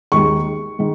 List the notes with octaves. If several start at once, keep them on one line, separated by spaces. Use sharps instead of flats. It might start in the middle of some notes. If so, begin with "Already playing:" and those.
D#2 D#3 G#3 C#6
D#3 G#3